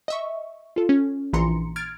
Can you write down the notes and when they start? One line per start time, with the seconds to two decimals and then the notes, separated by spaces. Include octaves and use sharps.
0.08 D#5 E5 C#6
0.76 F4 A4
0.89 C#4
1.33 A#1 E3 A#5 C6 C#7
1.76 F6 G#6 A6 D7